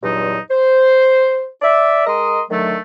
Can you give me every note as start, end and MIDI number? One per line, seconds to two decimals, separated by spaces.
0.03 0.37 40
0.03 0.37 43
0.03 0.37 46
0.03 0.37 54
0.03 0.37 63
0.50 1.47 72
1.62 2.04 74
1.62 2.04 76
2.06 2.41 56
2.06 2.41 70
2.06 2.41 75
2.06 2.41 84
2.06 2.41 87
2.50 2.78 50
2.50 2.78 51
2.50 2.78 54
2.50 2.78 57